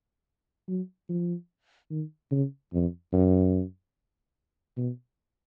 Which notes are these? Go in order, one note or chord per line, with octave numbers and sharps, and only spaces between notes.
F#3
F3
D#3
C#3
F2
F#2
B2